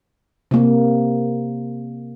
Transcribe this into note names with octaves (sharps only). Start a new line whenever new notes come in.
C3 A#3